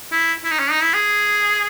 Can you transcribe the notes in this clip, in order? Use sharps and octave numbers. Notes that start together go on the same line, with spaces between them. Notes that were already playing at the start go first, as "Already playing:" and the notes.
E4
E4
D#4
C#4
D#4
E4
G#4